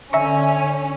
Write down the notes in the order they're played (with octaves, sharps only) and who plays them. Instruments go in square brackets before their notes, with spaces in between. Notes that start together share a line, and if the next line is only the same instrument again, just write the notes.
[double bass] D3 [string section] C#4 [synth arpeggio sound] E5 A#5 C#6 [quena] G#5